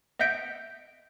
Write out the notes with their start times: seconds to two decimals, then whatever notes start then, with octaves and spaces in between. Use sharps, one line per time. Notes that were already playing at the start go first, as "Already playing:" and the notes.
0.19 D#5 E5 F#5 G6 B6 D7